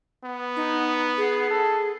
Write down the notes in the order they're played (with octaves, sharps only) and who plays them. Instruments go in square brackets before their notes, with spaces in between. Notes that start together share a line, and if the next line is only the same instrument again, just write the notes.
[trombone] B3
[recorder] D#4
G#4
[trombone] A4